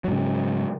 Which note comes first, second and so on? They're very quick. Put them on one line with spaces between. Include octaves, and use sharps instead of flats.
F#3 G#2 C#3